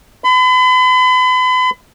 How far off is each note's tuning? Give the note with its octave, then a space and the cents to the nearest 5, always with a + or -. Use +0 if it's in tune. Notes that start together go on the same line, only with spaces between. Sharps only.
B5 +40